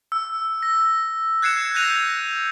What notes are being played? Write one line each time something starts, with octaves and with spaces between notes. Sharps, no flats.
E6
A#6
F#6 G#6 C7 C#7 E7
F#6 G6 A#6 D#7 F7